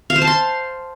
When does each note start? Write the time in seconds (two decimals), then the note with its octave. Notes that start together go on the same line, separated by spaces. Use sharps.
0.10 F5
0.16 C5
0.22 A5
0.27 C6